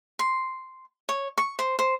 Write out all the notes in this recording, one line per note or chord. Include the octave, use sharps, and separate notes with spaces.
C6
C#5
C#6
C5
C5